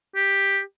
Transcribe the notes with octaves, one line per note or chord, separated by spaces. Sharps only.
G4